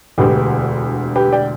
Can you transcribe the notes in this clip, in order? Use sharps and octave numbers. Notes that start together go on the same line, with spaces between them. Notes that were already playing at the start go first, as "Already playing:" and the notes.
E1 D2 D3 G4 B4
G4 B4
D5 G5